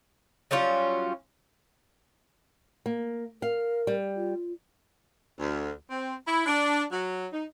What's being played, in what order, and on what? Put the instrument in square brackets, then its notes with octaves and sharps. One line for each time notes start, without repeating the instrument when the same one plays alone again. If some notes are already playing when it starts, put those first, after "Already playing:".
[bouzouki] F#3 G3 C#4 F4
[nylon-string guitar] A#3
[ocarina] A#4 [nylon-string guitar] F5
[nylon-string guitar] G3
[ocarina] F4
[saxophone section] D2
C4
E4
D4
F#3
D#4